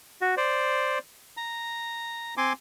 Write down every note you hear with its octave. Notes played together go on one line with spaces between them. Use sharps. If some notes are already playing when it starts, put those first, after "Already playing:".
F#4
C5 D5
A#5
C4 G#5 C6 D6